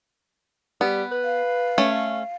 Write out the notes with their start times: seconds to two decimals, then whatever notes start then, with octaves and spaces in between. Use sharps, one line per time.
0.81 G3 B3
1.12 B4
1.24 F5
1.78 A3 C#4 C#5